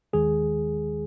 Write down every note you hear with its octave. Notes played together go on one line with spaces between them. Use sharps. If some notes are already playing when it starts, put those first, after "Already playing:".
D#2 D#3 G#3 G#4